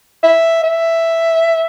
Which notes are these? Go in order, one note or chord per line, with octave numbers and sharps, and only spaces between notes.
E5
E5